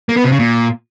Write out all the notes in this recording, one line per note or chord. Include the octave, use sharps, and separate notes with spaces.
A#3
B3
C3
C#3
A#2